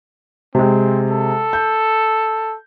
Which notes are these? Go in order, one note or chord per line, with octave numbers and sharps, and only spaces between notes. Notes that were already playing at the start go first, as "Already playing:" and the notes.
C3 G#3 C4
A4
G6